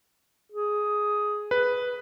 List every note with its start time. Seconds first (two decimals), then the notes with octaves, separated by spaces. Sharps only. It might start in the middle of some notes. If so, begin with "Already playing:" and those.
0.52 G#4
1.51 B4